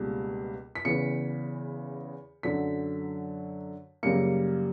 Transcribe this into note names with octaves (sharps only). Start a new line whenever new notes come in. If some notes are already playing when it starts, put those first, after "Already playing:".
Already playing: C#2 B2 G3 A#3
B6
E2 C#3 E3 C#7
F#2 D3 F#3 B6
F#2 C#3 G3 A#3 C#7